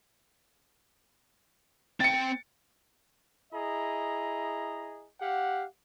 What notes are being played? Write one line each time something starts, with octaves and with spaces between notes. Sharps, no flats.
C4 G5 A6 C#7
E4 G#4 D#5 A#5
G4 F5 F#5